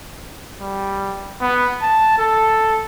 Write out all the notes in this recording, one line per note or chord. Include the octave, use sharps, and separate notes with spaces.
G3
B3
A5
A4